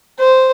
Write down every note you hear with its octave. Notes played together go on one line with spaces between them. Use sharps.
C5